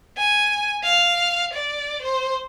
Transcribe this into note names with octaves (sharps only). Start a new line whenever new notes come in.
G#5
F5
D5
C5